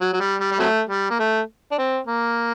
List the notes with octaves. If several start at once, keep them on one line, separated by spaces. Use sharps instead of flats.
F#3
F#3
G3
G3
G3
C3 F#3 A3
G3
A#3
A3
D4
C4
A#3